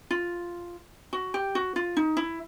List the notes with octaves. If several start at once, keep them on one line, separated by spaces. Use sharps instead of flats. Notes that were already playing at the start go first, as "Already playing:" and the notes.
F4
F#4
G4
F#4
F4
D#4
E4